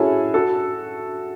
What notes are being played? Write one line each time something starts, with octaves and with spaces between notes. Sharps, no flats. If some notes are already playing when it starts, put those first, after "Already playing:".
Already playing: C#4 E4 F#4 G#4 A4
F#4 A4